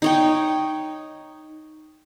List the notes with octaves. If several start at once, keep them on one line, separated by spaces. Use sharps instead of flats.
D#4 C#5 G5